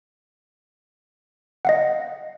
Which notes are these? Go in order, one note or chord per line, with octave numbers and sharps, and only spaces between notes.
D#5 F5 F#5